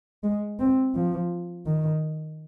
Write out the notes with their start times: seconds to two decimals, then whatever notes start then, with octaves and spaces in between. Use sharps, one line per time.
0.24 G#3
0.60 C4
0.95 F3
1.66 D#3